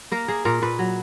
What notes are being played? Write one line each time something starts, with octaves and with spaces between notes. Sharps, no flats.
A#3 A#4
A#3 G#4
A#2 A#4
A#2 B4
F#3